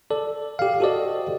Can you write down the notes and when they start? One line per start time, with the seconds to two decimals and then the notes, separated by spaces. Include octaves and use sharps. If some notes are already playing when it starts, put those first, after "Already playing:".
0.10 A4 D5
0.59 G4 F5
0.80 F#4 G4 A4 C5 D5 D#5